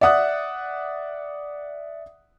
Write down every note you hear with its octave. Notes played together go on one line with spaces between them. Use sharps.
D5 E5 F#5 D#6 F#6